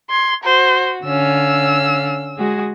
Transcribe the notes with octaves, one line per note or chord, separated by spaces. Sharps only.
C6 G#6
F#4 C5
D3 C#4 F5 E6
G#3 F#4 G#4